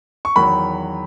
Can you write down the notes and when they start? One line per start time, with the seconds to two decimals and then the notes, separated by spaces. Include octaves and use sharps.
0.25 C#6
0.36 E2 D#3 F#3 B5